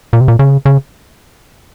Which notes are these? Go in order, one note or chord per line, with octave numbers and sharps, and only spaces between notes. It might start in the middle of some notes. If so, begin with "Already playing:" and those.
A#2
C3
A#2
C#3
C#3